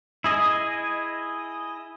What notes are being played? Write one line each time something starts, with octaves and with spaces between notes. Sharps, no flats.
E4 G#4 D#5